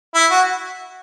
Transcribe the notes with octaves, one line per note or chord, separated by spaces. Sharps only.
E4
F#4